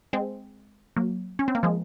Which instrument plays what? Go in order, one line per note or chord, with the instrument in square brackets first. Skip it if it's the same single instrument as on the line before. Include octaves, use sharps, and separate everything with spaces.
[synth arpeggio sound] G#3 C4
F#3 A#3
C#4
C4
A#3
F3 G#3